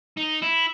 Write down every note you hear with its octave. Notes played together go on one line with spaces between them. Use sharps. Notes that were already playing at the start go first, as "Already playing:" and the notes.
D#4
E4